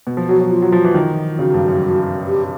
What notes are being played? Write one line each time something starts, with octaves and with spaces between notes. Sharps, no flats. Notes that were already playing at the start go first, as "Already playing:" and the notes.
B2
F3
F#3 F#4
F#3
F4
F#3
F3
E3
D#3
C#3 F#4
G2
F#2
G4